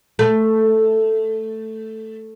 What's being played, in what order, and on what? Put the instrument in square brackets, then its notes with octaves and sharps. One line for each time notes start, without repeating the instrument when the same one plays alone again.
[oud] A3